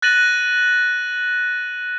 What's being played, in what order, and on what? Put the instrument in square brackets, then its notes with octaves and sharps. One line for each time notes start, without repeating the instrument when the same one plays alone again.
[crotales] F#6 A6 A#6 D#7 F#7